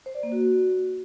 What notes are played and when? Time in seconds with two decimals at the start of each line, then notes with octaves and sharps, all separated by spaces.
0.06 C5
0.15 D5
0.23 A#3
0.32 F#4